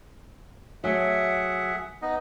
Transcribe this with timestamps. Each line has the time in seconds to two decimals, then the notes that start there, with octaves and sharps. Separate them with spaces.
0.84 F#3 A3 G#4 E5 F#5
2.02 B3 D#4 D#5